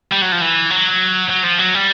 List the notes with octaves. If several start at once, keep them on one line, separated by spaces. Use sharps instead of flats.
G3
F#3
F3
E3
F#3
F#3
F3
F#3
G3